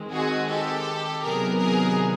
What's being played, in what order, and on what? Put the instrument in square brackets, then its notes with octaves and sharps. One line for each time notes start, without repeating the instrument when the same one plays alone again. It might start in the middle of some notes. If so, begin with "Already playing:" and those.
Already playing: [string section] D#3 G#3 C4
F#4 G#4
G4 A4
C3 D#3 F#3 B3 G#4 A#4
G#4 A#4